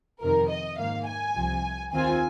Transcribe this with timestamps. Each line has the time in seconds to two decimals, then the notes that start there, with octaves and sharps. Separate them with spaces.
0.21 F2 C3 D#3 A#4
0.49 D#5
0.78 G#2 D#3 A#3 F5
1.06 G#5
1.35 C2 C3 F3
1.92 D#2 D#3 C4 F4 G#5